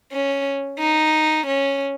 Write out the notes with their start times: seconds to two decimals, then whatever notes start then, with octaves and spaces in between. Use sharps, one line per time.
0.11 C#4
0.79 D#4
1.46 C#4